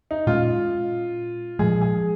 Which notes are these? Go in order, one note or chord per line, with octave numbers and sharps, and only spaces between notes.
D#4
A#2 G#3 C#4 F4
A#2 F3 G#3 G#4
G#4